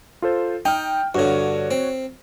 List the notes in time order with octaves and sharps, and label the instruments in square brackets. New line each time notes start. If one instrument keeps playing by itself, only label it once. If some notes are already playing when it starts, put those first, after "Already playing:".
[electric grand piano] F4 A4 C5
[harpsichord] D#4 [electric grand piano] G5 F6
[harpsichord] G2 D3 [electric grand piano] F#4 C#5
[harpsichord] C4